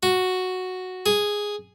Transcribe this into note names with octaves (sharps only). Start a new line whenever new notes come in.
F#4
G#4